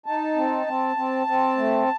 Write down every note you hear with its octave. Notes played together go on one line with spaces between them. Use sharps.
D#4 A5
C4
C4
C4
C4
A3